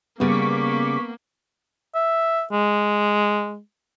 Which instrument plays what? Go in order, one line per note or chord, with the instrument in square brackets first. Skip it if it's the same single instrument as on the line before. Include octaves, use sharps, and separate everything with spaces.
[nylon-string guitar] C#3 G3 [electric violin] A#3 [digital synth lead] B3 [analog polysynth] C#6 D6 B6
[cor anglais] E5
G#3